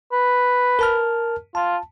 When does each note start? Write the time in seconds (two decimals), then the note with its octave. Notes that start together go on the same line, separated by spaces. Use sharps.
0.12 B4
0.79 A#4 A5 F6
1.55 F4 A5